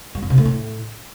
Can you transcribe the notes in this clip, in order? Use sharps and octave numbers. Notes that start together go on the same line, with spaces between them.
G3
F2
C3
A3
A2